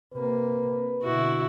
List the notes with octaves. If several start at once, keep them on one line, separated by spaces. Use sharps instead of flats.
C3 A#3 B4
B2 D3 E4 F#4